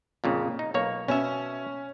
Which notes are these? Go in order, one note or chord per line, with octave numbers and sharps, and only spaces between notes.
F2 A#2 C#3
D#4
B1 A#3 C#5
B2 C#4 E5